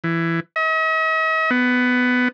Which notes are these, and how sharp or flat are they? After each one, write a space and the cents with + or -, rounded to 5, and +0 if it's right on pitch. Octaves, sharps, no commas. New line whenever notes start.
E3 +15
D#5 +45
B3 +15